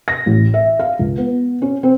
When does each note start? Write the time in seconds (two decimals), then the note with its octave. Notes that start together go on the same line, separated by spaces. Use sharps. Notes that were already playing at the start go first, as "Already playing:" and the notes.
0.08 A#6
0.26 A1
0.54 E5
0.79 F5
0.99 C#2
1.18 B3
1.62 C#4
1.83 C4